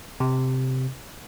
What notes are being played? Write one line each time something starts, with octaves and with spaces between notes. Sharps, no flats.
C3